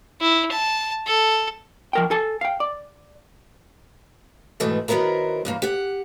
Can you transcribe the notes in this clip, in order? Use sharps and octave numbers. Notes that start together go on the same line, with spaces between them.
E4
A5
A4
F3 A#4 G5
A4 G#5 A5
F5 G5
D5
G#2 B2 D#3 E3 A3
D#3 F#3 B3 E4 A#4 C5
E2 G2 A#3
G4 F#5